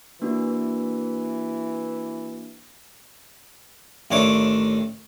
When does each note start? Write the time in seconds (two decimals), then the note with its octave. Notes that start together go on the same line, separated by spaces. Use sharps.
0.22 E3 A#3 D4 F#4
4.11 A1 D#3 D4 C#5 E5 D6